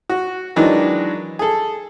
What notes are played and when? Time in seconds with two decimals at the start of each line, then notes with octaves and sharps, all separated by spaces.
0.09 F#4
0.56 D#3 E3 F#3 G#3 D4
1.39 G#4 A4